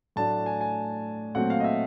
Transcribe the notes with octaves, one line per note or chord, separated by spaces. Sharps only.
A2 F#3 A3 D4 A5
G#5
G#5
A#2 F#3 A3 C4 F#5
F5
D#5
E5